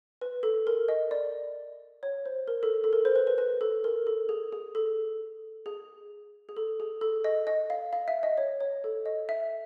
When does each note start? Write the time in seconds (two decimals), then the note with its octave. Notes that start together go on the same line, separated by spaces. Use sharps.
0.21 B4
0.43 A4
0.67 A#4
0.88 D#5
1.11 D5
2.03 C#5
2.26 C5
2.48 A#4
2.63 A4
2.84 A4
2.93 A#4
3.05 C5
3.16 B4
3.27 B4
3.38 B4
3.61 A4
3.84 A#4
4.07 A4
4.29 G#4
4.52 G#4
4.75 A4
5.66 G#4
6.49 G#4
6.57 A4
6.80 G#4
7.01 A4
7.24 D#5
7.47 D#5
7.70 F5
7.93 F5
8.08 E5
8.23 D#5
8.38 C#5
8.60 C#5
8.84 A4
9.06 D#5
9.29 E5